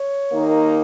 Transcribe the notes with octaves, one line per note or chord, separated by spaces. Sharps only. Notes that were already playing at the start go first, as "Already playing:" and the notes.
Already playing: C#5
D#2 D#3 A#3 D#4